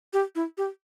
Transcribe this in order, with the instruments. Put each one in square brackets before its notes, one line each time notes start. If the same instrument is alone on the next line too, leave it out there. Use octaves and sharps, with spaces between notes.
[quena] G4
E4
G4